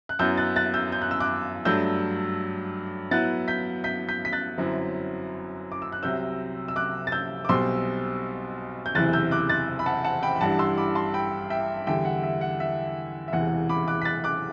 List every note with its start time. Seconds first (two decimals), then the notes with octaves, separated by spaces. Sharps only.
0.09 F#6
0.19 F#2 F#3 B3 E4 E6 G6
0.37 F#6 A6
0.56 F#6 A6
0.74 E6 G6
0.92 G6
1.02 F#6
1.11 E6
1.20 D6 F#6
1.65 G2 F#3 A3 D4 E6 G6
3.11 A2 F#3 B3 E4 F#6 A6
3.48 G6 B6
3.84 G6 B6
4.09 G6 B6
4.25 B6
4.33 F#6 A6
4.58 G1 F#2 F#3 C4 E4
5.72 D6
5.82 E6
5.92 F#6
6.03 C2 C3 F#3 E6 G6
6.68 E6
6.76 D6 F#6
7.07 A6
7.12 E6 G6
7.45 D6
7.49 B1 B2 G3 C4 C6 E6
8.86 G6
8.95 F#1 E2 C3 E3 F#6 A6
9.13 E6 G6
9.31 D6 F#6
9.49 F#6 A6
9.79 B5
9.86 F#5 A5
10.04 F#5 A5
10.23 G5 B5
10.36 B5
10.41 A1 G2 E3 G3 D4 F#5 A5
10.59 C6 E6
10.77 B5 D6
10.95 A5 C6
11.14 G5 B5
11.50 E5 G5
11.87 E2 D3 G3 E5 G5
12.05 F#5
12.23 E5
12.41 F#5
12.60 E5
13.28 E5
13.33 E1 E2 C3 E3 F#5
13.69 B5 D6
13.88 D6 F#6
14.02 B6
14.05 F#6 A6
14.24 D6 F#6